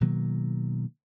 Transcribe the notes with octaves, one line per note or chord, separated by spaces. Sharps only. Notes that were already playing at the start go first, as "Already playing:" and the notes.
B2 D#3 F#3 A#3